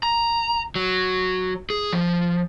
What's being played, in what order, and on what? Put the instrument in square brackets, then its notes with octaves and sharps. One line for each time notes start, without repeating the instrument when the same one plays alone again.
[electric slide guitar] A#5
F#3
G#4
F3